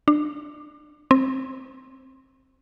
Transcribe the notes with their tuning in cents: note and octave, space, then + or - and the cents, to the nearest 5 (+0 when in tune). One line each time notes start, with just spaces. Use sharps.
D4 +25
C4 +15